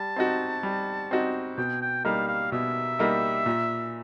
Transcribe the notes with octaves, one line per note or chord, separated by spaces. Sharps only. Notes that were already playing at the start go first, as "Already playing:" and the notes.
Already playing: G3 A5
C4 D#4 F#4
G3
C4 D#4 F#4
B2 G5
G5
G3 A#3 D#4 F5
F5
B2 E5
G3 A#3 D#4
A#2